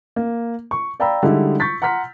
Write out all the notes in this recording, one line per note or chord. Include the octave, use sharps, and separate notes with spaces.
A#3
C#6
D5 F5 G5 A#5 B5 E6
D3 G3 G#3 D#4 E4
C#6 G6 A6 B6
F#5 A#5 C6 F6 B6